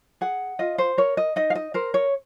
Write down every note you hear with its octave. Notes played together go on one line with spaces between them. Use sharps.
G#4 F#5
F4 D#5
C5
A#4 C#5
D#5
D#4 D#5
F5
D#5
A#4 C5
C#5